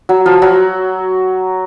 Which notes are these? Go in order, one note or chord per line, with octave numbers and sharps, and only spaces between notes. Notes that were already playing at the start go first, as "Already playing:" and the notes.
F#3 F#4
F3 F4
F#3 F#4